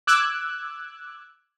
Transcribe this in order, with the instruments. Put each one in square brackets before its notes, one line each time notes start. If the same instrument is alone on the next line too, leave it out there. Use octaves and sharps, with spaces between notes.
[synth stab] D6 E6 F#6 G#6